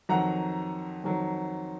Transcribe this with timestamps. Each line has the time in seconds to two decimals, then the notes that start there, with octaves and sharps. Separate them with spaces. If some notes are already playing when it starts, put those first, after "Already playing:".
0.09 F2 D#3 F#3 F#5 A#5
1.04 F2 D#3 F#3